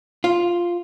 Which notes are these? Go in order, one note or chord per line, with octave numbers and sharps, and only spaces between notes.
F4